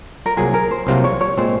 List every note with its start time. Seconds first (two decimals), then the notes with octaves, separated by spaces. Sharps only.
0.26 A#4
0.36 C2 C3 F#3 A#3 F4 G#4
0.53 A#4
0.71 C5
0.87 C2 C3 F#3 A#3 F4 C5
1.04 C#5
1.21 C#5
1.37 A#2 G#3 C4 C5